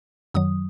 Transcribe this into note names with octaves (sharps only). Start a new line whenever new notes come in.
F#2 D#3 F#3 D#6